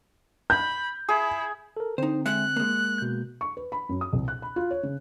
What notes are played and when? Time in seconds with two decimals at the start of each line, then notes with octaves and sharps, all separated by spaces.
0.50 B5 G6
1.09 E4 G#4
1.77 A4 A#4
1.98 D3 C4 D#4 C5
2.26 G#3 E5 F#6
2.56 G#3 A#3
2.98 B2 G6
3.41 C#6
3.57 B4
3.72 B5
3.89 F#2
4.01 D#6
4.13 C2
4.28 F#6
4.42 B5
4.56 F4
4.71 C#5
4.83 C#3